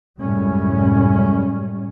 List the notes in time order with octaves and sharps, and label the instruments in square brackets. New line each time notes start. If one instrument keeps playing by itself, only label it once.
[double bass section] C2 F#2 A2 G3 G#3 C#4